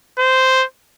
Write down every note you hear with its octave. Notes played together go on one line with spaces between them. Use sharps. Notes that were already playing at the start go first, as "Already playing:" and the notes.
C5